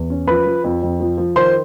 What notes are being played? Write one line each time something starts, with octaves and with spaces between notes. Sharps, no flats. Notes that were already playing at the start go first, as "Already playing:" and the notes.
Already playing: E2
C#4
F3 B4 B5
F3
F2
F2
F3
F3
D#3 C5 C6